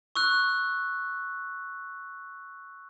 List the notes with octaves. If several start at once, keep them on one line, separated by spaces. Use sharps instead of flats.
C#6 E6 F#6